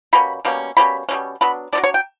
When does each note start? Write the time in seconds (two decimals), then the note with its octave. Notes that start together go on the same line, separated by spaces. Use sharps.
0.13 B2 G3 A#3 C#4 B5
0.45 B2 G3 A#3 C#4
0.77 B2 G3 A#3 C#4 B5
1.09 B2 G3 A#3 C#4
1.41 F#3 B3 D4 B5
1.73 F#3 B3 D4 D5
1.84 C#5
1.94 G5